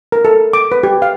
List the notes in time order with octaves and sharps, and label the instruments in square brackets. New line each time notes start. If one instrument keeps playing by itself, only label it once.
[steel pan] A#4
A4
D6
B4
G4
F5